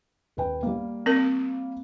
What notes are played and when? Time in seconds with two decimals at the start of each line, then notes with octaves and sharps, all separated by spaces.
0.37 D#1 B4 G5
0.63 G3 A#3
1.06 C4 A#4